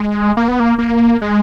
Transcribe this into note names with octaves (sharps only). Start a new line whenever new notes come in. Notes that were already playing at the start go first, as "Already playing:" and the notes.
Already playing: G#3
A#3
B3
A#3
A#3
G#3